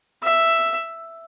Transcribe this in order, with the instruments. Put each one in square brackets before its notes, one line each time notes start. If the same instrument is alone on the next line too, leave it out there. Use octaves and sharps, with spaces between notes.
[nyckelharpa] E5